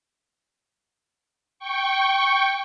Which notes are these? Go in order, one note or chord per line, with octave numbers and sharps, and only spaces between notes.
G5 C#6